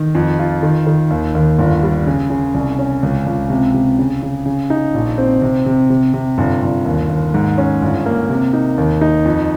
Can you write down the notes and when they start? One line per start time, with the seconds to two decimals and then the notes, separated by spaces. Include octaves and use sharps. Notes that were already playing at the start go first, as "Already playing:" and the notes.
Already playing: D#3
0.15 F2
0.39 F4
0.63 D#3
0.87 D#3
1.11 D#2
1.35 D#2
1.59 G1
1.83 G3
2.06 C#3
2.30 C#3
2.54 C2
2.79 C#4
3.03 C#2
3.26 C#2
3.50 C3
3.74 C3
3.99 C#3
4.23 C#3
4.46 C#3
4.70 D#4
4.94 A#1
5.18 C4
5.42 C3
5.66 C3
5.90 C3
6.14 C3
6.38 G1
6.62 G1
6.86 D#2
7.10 D#2
7.34 G#2
7.58 C#4
7.82 G1
8.06 A#3
8.30 C3
8.53 D#4
8.78 D#2
9.01 D#4
9.25 F2